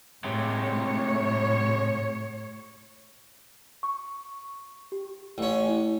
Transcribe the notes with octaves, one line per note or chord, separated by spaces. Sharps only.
A2 C3 G#3 C#5
C#6
G4
A1 C#4
E4